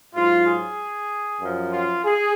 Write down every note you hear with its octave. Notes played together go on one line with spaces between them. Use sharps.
G#2 F#3 F4
G#4
F#2 F3
F4
G#4